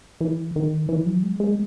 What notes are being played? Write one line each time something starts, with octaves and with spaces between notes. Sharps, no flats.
E3
D#3
E3
F#3
G#3
G#3